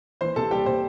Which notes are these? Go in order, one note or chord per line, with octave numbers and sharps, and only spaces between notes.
E3 C5 C6
C3 A4 A5
G3 G4 G5
C3 C5